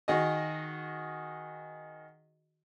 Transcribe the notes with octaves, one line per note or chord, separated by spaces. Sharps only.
D#3 F#4 G#4 D#5